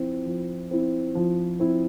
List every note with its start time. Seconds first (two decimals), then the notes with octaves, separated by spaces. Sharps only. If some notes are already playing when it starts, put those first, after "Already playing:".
Already playing: F3 C4 E4
0.25 F3
0.71 C4 E4
1.15 F3
1.60 C4 E4